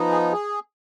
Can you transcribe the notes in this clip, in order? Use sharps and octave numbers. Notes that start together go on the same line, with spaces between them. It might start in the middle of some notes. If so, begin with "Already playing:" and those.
Already playing: F3 B3 D#4
G#4
G#4